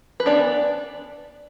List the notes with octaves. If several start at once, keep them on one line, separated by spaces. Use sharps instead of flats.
B4
E3 B3 D4 D5